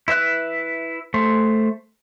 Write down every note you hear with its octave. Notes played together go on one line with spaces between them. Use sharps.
E4 B4 E5 F#6
A3 C5